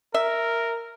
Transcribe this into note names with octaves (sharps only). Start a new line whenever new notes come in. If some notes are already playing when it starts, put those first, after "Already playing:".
A#4 E5